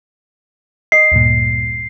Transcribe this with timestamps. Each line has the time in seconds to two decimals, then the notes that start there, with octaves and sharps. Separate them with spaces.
0.92 D#5 C7
1.12 D2 G2 A#2